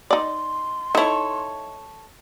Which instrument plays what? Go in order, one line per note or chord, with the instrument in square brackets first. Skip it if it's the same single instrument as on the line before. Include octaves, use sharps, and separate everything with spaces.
[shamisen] D#4 D5 [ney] C6
[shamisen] D#4 E4 [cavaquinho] A4 C#5